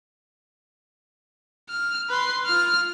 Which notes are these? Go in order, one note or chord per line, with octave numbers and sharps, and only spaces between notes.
F6
B4 C6
F4 F6